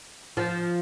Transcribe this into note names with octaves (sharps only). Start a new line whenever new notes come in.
F3